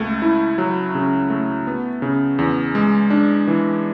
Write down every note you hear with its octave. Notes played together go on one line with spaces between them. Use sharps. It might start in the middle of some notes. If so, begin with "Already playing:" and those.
Already playing: C#2 A3
E4
F#3
C#3
A3
B3
C#3
E2
G#3
D4
E3